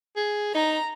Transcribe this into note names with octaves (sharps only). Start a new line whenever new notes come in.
G#4
D#4 A#5